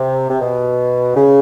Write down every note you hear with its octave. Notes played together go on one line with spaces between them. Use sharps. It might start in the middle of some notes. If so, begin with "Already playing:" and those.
Already playing: C3
C3
B2
C#3